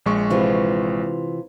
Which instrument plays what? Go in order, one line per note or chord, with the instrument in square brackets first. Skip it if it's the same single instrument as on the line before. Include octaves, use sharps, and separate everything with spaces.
[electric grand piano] A#1 G#3 C#6
[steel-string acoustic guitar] C3 E3 F4